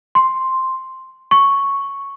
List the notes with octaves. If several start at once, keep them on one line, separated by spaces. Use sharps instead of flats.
C6
C#6